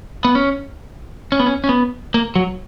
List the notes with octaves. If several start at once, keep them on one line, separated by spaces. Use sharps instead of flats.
B3
C#4
C#4
B3
C#4
C#4
B3
A#3
F#3